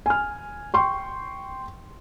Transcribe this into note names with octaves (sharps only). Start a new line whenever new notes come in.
G#5 F6
G5 C6 C#6